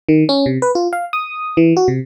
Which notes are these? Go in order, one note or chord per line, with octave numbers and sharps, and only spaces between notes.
D#3
C#4
C3
B4
F4
F5
D#6
E3
F#4
C3